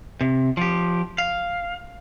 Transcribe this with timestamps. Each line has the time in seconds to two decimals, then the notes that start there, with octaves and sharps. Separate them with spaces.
0.21 C3
0.57 F3 G4
1.18 F5